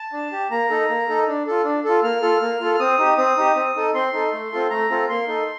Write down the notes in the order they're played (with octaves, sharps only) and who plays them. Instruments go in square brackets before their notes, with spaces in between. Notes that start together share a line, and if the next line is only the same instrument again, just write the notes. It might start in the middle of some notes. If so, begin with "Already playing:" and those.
Already playing: [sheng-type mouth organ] A5
D4
G4
A#3 A#5
D#4 A4
A#3
D#4 A4
D4
F4 A4
D4
F4 A4
A#3 F6
F4 A4
A#3
F4 A4
F6
C4 D#6
D#4 G4
C4 D#6
D#4 G4
C4
D#4 A4
C4 C6
D#4 A4
A3
C4 F4 A4
A3 A#5
C4 F4 A4
A#3 C6
D#4 A4